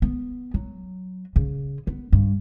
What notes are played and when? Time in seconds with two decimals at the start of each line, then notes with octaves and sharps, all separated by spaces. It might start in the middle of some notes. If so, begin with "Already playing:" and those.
0.02 B3
0.54 F#3
1.36 C#3
1.87 B3
2.12 G2